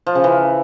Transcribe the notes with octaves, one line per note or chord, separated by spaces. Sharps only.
F3
C#3
E3